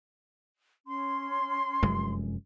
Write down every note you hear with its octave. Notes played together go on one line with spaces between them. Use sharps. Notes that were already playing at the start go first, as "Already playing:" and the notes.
C#4 C6
F1 F#2 G#3